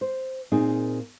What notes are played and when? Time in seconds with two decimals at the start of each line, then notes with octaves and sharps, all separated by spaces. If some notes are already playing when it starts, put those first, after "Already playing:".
0.01 C5
0.52 A#2 A#3 C4 D#4 G#4